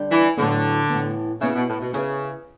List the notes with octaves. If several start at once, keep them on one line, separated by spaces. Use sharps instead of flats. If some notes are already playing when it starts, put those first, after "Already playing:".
Already playing: D3 G3 D4 G4 D5
E3
A2 D3 F#3 B3
A2 E3 B3
C#3 B3 E4 B4 E5
B2
A2
B2
C#3 B3 E4 B4 E5